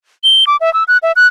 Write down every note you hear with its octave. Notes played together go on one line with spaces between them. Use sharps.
G7
D6
E5
E6
F#6
E5
F#6